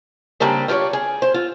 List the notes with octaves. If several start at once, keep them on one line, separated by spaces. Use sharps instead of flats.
C#3 G3 A#3 C4 D4 G4
F4 G4 B4 C#5 D5
G#4
C5
F4